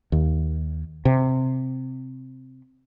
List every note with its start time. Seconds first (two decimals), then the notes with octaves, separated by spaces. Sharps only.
0.12 D#2
1.05 C3